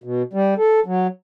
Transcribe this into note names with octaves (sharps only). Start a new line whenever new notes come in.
B2
G3
A4
F#3